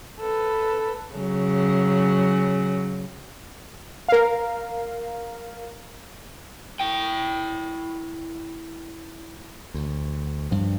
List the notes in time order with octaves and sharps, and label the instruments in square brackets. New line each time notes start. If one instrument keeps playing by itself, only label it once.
[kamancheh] A4 B4
[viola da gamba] C#3 F#3
[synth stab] A#4 F5
[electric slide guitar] E4 G5
[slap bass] D2
G2 F3